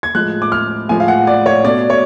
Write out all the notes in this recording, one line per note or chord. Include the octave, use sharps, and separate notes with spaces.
G#6
A2 F3 G#3 F#6
D6
F6
A2 F3 G#3 G#5
F5
F#5
D5
C#5
B2 A3 D5
C#5